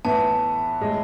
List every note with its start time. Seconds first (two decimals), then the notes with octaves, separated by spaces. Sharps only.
0.05 A2 E3 B3 A5
0.81 A2 G#3